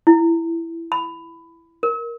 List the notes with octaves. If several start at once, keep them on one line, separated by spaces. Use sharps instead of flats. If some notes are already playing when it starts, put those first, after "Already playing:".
E4
B5
A#4